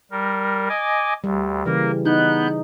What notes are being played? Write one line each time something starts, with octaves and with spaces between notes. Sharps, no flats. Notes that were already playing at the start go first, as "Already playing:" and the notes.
G3 A#4
D#5 G#5 D6
D2 G3
C#3 E3 A#3 A#4
B3 D#4 F#6 G6